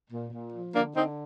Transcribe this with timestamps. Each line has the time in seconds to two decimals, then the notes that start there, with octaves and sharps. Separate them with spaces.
0.09 A#2
0.30 A#2
0.52 F3
0.73 D3 A#3 D4
0.95 D3 C4 D#4